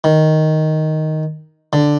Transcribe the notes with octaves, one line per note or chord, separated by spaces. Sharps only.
D#3
D3